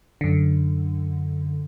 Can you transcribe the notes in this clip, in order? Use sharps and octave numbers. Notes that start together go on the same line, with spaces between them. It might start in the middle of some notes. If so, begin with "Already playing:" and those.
F#2 D3